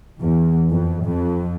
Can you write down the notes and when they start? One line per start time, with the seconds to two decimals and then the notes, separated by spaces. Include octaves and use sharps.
0.21 E2
0.72 F2
1.05 F2